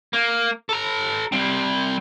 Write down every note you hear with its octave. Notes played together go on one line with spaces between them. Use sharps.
A#3
A4 A#5
G3 C4